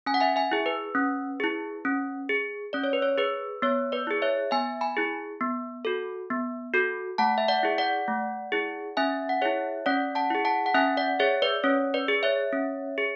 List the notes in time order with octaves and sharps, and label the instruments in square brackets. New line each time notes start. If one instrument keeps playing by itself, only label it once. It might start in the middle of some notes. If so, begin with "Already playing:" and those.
[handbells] C#4 G#5
F#5
E5 G#5
E5 G#5
E4 G#4
B4
C#4
E4 G#4
C#4
G#4
C#4 D5
C#5
B4
C#5
G#4 B4
B3 C#5
B4 D5
E4 G#4
C#5 E5
B3 E5 G#5
G#5 B5
E4 G#4
B3
F#4 A4
B3
F#4 A4
A3 F#5 A5
E5
D5 F#5
E4 G#4
D5 F#5
A3
E4 G#4
C#4 E5 G#5
F#5
E4 G#4 C#5 E5
C#4 D5 F#5
F#5 A5
E4 G#4
F#5 A5
F#5
C#4 E5 G#5
D5 F#5
G#4 C#5 E5
B4 D5
C#4 C#5
B4 D5
G#4
C#5 E5
C#4
G#4